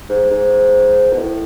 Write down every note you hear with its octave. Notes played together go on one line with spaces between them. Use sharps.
G#2
G#2
B2
A2